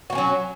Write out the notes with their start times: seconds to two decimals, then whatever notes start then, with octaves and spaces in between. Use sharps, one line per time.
0.10 F#4
0.12 A#3
0.15 C#4
0.18 F#3